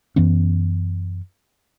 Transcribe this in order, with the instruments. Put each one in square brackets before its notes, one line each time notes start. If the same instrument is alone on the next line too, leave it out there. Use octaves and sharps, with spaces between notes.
[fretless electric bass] F#2 E3 B3 C#4